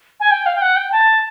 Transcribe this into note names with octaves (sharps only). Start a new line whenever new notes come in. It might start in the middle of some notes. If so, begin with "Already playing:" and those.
G#5
G5
F5
G5
F#5
G5
A5